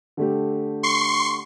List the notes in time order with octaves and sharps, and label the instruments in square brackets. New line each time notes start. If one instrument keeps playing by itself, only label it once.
[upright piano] D3 A3 G4
[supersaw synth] C6 C#6 C7